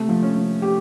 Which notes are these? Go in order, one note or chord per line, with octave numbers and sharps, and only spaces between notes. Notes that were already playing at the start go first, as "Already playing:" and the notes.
Already playing: C3 A3
F3
C#4
F3
G4